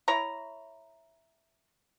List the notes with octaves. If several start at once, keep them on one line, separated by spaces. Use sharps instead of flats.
E4 C#5 A#5